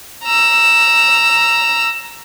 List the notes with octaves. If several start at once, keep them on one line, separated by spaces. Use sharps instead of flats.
A#5 E6